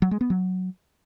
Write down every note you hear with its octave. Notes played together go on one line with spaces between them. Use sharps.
F#3
G#3
B3
F#3